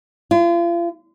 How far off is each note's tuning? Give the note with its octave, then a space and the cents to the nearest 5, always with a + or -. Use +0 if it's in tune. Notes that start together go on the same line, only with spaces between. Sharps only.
F4 -35